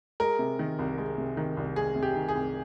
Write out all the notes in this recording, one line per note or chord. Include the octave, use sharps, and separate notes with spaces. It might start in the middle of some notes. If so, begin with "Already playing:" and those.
G#3 A#4
C3
D#3
C2
G#3
C3
D#3
C2
G#3 G#4
C3
G4
D#3
G#4
C2